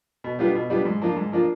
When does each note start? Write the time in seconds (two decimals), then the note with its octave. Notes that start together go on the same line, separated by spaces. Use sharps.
0.24 B2
0.39 G3 B3 D4 F4
0.55 B2
0.70 G3 B3 D4 F4
0.85 G#2
1.01 F3 A#3 D4 F4
1.16 G#2
1.32 F3 A#3 D4 F4